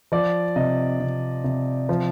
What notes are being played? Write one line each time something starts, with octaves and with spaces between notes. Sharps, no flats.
F3 D5
C3 D#5
C3
C3
F3